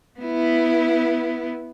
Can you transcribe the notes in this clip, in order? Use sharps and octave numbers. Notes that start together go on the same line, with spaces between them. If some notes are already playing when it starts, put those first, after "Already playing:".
B3 E4